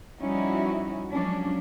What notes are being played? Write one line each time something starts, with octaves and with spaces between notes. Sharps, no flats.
F3 G3 C#4 D#4 E4 F#4
F3 F#3 G#3 A#3 C#4 D4